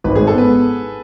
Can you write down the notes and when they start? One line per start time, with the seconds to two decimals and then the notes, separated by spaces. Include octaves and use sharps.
0.04 G#1 B4
0.15 G#2 G#4
0.27 A4
0.34 B3 B4